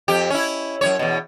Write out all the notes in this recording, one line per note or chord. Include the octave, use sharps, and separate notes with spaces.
F2 G4
C#4 E4
F#2 C3 C#5
E2 B2